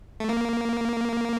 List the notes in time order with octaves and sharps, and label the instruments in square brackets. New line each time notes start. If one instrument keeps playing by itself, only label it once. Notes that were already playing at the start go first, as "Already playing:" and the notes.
[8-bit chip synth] A3
A#3